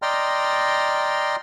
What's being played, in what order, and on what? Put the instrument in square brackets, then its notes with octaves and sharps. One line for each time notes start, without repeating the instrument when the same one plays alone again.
[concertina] D5 D#5 G5 A#5 C6 F6